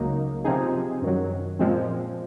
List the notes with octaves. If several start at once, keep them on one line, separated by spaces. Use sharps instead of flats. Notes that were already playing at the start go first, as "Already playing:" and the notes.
Already playing: C#2 C#3 F#3 A#3 D#4
C3 F3 C4 D#4 G#4
F#2 D#3 F#3
A#2 F3 G#3 C4